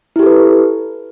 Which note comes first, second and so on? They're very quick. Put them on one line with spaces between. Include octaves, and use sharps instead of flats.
E4 G4 A4 B4